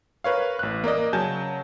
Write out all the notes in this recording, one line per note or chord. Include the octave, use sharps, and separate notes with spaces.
A#4 B4 C#5 F5
A1 F#6
A#3 A#4 D5 D#5
C#3 F#3 G#5 A5 G6